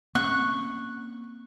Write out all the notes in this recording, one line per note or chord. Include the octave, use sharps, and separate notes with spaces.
A#3 C4 C#4 C#6 F#6